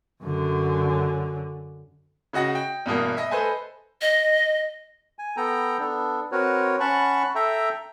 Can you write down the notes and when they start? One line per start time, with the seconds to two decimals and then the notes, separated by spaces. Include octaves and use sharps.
0.23 F#2 D3
2.33 C#3 F#4 D#5 F#5 A#6
2.55 G5
2.86 E2 G2 B2 A#3
3.17 D#5 E5
3.31 A4 B4 C5 D#5 G#5 A5
4.01 D#5
5.19 G#5
5.37 B3 A4 G5 A#5
5.79 B3 D4 A4
6.32 C4 F#4 A#4 B4 C#5
6.80 C#4 F#5 A5 B5 C#6
7.35 A4 E5 G5 A#5